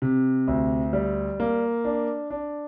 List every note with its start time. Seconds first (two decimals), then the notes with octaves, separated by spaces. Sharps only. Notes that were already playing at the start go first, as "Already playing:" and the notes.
0.02 C3
0.48 D2
0.93 G3
1.40 A#3
1.85 D4
2.30 D4